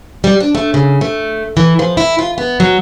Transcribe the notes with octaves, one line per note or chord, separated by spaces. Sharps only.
G3
D4
A3
C#3
A3
E3
F3
E4
F4
B3
F#3